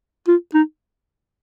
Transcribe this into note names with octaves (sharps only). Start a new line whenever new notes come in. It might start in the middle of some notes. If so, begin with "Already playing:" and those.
F4
D#4